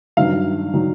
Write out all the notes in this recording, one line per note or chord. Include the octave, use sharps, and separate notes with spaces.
G2 D#3 F#3 F5
D#3 F#3